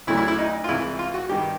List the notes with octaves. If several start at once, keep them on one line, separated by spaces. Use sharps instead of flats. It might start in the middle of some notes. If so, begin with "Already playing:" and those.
D2 C#3 F#3 A3 E4
E4
E4
D#4
F4
C2 C3 E3 G#3 E4
F4
F#4
G2 D#3 G3 G4